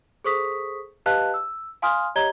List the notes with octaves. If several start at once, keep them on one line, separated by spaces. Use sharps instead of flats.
G#4 A4 C5 C#6 D#6 B6
G4 B4 D#5 F5 A5 F#6
E6
F5 G#5 C6 D#6 F6
G4 C#5 D#5 A#5 G#6 G7